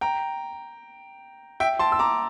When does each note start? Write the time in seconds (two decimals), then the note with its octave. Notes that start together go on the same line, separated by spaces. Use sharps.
0.01 G5 A#5
1.60 E5 G5
1.79 A5 C6
1.92 E6
1.99 A#5 D6